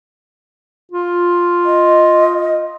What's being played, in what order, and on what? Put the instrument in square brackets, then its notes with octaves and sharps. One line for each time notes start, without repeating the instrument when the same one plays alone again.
[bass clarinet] F4
[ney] D#5